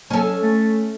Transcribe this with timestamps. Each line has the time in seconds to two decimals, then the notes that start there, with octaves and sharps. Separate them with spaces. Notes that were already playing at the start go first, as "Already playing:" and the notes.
0.10 F#3 C#4 A4
0.42 A3